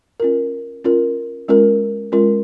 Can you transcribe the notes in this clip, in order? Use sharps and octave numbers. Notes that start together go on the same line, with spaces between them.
C#4 F4 A#4
C#4 F4 A#4
G#3 C#4 F4 A#4
G#3 C#4 F4 A#4